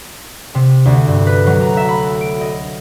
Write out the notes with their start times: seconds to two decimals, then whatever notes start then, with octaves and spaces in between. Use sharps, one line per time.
0.55 C3
0.85 D2
1.08 G2
1.27 B4
1.47 F#3
1.61 A#5
1.77 E5
1.89 B5
2.21 D7
2.41 D#5